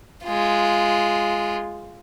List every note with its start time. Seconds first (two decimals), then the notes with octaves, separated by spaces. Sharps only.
0.24 G#3 F4